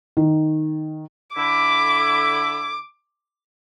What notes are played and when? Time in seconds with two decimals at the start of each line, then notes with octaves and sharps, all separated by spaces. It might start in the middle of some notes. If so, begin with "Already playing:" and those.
0.17 D#3
1.36 D3 E4 D6